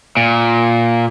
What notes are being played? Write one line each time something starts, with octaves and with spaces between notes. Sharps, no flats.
A#2